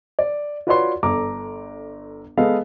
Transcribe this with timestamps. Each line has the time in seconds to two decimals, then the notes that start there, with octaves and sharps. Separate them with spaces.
0.19 D5
0.67 F4 F#4 B4 C#5 D5 C6
1.03 G1 A4 A#5 D6
2.37 G#3 B3 A4 D#5 F5